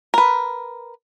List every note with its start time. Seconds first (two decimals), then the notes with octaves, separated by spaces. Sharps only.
0.14 A#4 B4